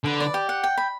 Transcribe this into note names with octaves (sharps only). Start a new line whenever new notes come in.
D3 B4
D5
G4
F#5
G5
B5